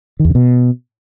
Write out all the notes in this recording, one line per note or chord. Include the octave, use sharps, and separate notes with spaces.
D#3
E2
C#3
B2